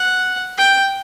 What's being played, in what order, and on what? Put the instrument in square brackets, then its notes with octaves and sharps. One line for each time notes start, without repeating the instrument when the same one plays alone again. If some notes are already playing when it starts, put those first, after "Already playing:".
Already playing: [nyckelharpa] F#5
G5